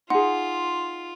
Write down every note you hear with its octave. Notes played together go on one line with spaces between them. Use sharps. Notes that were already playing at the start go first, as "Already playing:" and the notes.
D#4 F4 G#4 F#5 C6